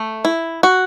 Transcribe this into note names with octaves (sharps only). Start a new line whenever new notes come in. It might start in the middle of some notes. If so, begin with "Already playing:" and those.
Already playing: A3
E4
F#4